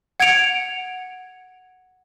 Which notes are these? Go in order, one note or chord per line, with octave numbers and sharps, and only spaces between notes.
F#5 G#6 C#7 D7 F7